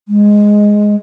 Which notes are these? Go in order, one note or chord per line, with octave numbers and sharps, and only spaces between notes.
G#3